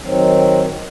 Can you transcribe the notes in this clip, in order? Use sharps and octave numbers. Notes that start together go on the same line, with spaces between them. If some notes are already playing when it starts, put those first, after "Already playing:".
D#3 F#3 C4